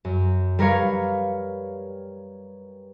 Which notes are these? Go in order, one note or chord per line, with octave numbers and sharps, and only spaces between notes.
F#2
G3 A#4 B4 C#5 F5